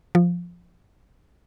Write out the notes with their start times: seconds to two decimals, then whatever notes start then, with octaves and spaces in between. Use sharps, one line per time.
0.15 F3